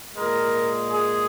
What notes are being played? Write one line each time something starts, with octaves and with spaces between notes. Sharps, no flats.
A#2 G#3 A#4
G#4